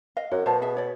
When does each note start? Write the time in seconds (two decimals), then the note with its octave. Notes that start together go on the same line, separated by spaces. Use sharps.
0.17 D#5 F5
0.31 F#2 F#4
0.46 B2 C5 F5 A5
0.62 G#4 E5
0.77 C#5 D5